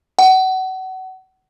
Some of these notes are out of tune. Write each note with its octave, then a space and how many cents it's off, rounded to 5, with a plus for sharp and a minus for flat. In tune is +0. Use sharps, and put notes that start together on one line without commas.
F#5 +30